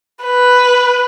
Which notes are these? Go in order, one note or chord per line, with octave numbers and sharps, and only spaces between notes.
B4